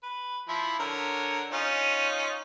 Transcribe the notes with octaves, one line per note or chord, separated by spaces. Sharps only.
B4
F3 E4
D3 A#4 C#5
C#4 D#4 F4